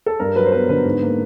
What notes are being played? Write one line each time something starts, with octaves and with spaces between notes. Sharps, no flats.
A4
G2 A#4
F#3 B4
C5
B3 B4
D3 B4
G#2
A#3